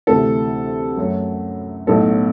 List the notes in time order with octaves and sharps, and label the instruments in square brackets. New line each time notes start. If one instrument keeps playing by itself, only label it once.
[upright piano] D2 C3 E3 A3 A4
F#2 F#3 A3
B1 A2 F#3 A3 A4